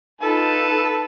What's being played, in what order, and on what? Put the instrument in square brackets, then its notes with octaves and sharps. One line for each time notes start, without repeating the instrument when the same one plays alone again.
[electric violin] D#4 F4 [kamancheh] A4 [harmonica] B4 A5